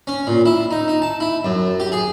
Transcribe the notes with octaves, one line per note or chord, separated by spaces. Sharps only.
C#4
A#2
E4
D#4
D#4
A5
E4
F#2
G4
G#4